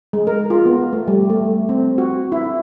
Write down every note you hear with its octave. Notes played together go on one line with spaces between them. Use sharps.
G#3
A#4
F4
B3
A3
G3
A3
C4
F#4
E4